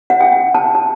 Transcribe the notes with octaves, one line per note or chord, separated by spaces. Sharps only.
F#5
G5
A5
A5